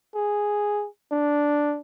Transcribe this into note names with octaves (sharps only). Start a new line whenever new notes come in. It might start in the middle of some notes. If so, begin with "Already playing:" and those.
G#4
D4